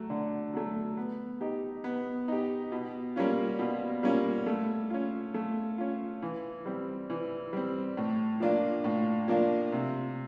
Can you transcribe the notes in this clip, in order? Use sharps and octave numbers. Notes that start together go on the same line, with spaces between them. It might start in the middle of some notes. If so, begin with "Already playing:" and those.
Already playing: F#3 A3
D3
F#3 A3
B3
D#4 G4
B3
D#4 G4
B2
G3 A#3 C#4 F4
B2
G3 A#3 C#4 F4
A3
C#4 F4
A3
C#4 F4
E3
G3 C4
E3
G3 C4
A2
F3 A#3 D4 F4
A2
F3 A#3 D4 F4
C3